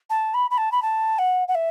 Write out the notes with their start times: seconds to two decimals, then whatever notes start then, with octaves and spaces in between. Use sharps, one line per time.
0.10 A5
0.34 B5
0.50 B5
0.58 A5
0.72 B5
0.82 A5
1.18 F#5
1.48 F#5
1.55 E5